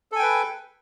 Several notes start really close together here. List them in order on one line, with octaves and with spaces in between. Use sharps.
A4 G#5 G5 B4